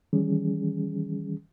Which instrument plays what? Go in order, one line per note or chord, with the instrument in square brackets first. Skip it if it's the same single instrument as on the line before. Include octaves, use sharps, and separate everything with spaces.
[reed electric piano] D#3 E3 G3 C#4 G#4